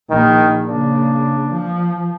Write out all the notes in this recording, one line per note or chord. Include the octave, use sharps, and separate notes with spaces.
A#1 D#3
C#3 A#3 D4
F3